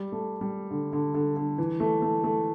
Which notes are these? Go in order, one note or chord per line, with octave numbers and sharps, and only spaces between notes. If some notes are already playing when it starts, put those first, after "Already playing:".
Already playing: G3
A3
G3
D3
D3
D3
D3
E3
A3
A3
A3